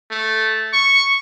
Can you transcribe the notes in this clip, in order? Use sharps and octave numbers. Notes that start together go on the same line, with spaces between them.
A3
C#6